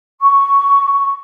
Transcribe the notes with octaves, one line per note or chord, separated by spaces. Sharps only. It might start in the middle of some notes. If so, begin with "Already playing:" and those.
C#6